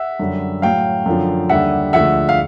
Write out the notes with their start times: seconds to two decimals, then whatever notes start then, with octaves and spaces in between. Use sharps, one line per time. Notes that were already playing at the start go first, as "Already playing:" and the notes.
Already playing: E5 F#5
0.19 F#2 D3 G3
0.62 A2 F#3 F5 G5
1.06 F#2 D3 F3
1.49 D#2 D3 G3 E5 F#5
1.93 D2 D3 F3 G#3 E5 F#5
2.29 F5